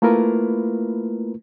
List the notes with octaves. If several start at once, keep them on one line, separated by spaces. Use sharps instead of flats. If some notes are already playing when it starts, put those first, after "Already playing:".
A3 A#3 E4 F4 A#4 B4